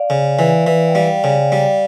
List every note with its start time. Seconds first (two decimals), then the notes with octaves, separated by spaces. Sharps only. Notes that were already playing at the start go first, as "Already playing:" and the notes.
Already playing: D5 F5
0.10 C#3
0.39 E3
0.67 E3
0.88 G5
0.95 G3 D5 F5
1.24 C#3
1.52 G3